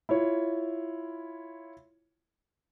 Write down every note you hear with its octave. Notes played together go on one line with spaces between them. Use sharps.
E4 F4 C#5